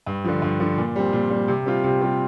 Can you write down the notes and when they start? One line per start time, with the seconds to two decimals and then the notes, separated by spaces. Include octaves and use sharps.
0.06 G2
0.24 D3 F3
0.42 G2
0.60 D3 F3
0.78 A#2
0.96 G3 C4
1.13 A#2
1.30 G3 C4
1.48 C3
1.66 G3 C4 F4
1.84 C3
2.01 G3 C4 F4